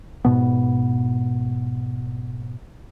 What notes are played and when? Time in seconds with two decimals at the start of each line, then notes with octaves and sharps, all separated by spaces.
0.25 G#2 B2 B3